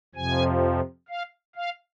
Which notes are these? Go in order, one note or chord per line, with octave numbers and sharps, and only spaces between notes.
F2 C3 F3 G#5
F5
F5